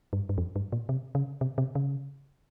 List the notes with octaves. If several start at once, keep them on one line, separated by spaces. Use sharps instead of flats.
G2
G2
F2
G2
A#2
C3
C#3
C3
C3
C#3